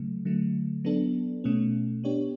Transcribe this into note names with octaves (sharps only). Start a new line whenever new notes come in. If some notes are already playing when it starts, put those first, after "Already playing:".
Already playing: C#3 F#3 A3
D3 F#3 A3
F#3 B3 D4 A4
B2 A3 C#4
B3 D4 G4 C#5